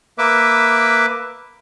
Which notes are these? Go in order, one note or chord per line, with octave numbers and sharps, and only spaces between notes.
A#3 B4 E5 D6